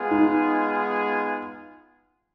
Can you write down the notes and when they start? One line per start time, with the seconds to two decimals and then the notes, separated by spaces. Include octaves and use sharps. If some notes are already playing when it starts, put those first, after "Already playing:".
Already playing: G#3 B3 F4 G#4
0.11 D#4